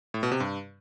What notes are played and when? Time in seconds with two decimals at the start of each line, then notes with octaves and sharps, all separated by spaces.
0.14 A2
0.23 B2
0.32 C3
0.40 G2